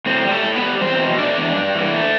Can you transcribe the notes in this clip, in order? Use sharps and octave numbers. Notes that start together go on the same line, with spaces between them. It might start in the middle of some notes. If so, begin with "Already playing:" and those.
A2 C4
G3
A3 A4
A2
B3 B4
G3
E2 C4 C5
B2
A3 D4 D5
E2
G2
E3
A3